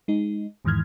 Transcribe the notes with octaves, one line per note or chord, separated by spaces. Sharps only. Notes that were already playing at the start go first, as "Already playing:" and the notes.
G#3 D#4
E2 G#2 D#3 E3 F6 G#6